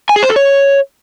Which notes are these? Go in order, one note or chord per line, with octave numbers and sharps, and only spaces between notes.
G#5
G#4
C5
A4
C#5